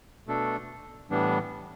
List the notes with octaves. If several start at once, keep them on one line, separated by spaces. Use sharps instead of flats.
B2 A3 D4 A4
A2 E3 G3 B3 D4